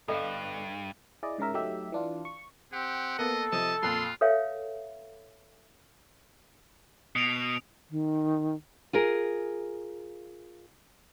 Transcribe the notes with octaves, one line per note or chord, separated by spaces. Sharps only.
G2 D3 B3 A4 D#5 F5
E4 G#4 D5 D#5
G#2 C#3 C#4 A#4 E5
F#3 A3 D#4 G4 E5
E3 D4 F4
C#6
C4 G4 F#5
A#3 B3 A4 D#5
C3 F3 D#5 A5
F2 A#2 F4 C6 F#6
A4 B4 C#5 E5 F5 G5
B2 D#6 D7 F7
D#3
F4 G#4 A#4